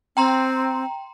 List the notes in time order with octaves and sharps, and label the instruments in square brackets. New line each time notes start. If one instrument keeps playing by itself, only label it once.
[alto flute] C4 [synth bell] G5 A#5 C6